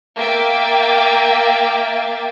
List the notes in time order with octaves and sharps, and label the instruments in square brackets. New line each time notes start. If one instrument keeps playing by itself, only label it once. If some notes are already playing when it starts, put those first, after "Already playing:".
[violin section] A#3 E5 G5 A6